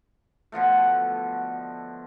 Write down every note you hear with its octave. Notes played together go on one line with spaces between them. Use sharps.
B2 D3 F3 A3